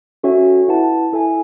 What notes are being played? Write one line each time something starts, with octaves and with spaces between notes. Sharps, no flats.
C#4 F#4 A4 C#5 E5
E4 B4 F#5 A5
E4 A4 E5 G#5